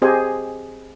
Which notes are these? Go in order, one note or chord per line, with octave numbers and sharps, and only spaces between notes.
C4 G4 G#4 C5 D#5 G#5